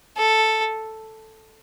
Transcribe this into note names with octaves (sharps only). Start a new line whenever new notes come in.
A4